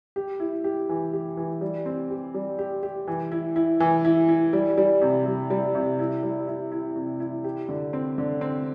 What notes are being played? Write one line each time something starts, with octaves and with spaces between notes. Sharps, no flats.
G4
E4
G4
E3
G4
E3
G3
C4
G4
G3
G4
G4
E3
E4
E4
E3
E4
E4
G3
G3
C3
G3
G3
C3
E4
G3
E4
E4
C3
E4
G4
D3
C4
D3
C4